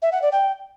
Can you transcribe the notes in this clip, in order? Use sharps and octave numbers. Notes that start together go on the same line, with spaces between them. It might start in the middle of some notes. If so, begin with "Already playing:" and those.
E5
F#5
D5
G5